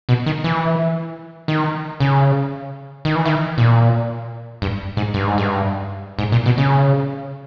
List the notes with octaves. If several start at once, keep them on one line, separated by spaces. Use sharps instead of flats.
B2
D#3
E3
D#3
C#3
D#3
E3
D#3
A#2
G2
G#2
G2
G#2
G2
G#2
A#2
B2
C#3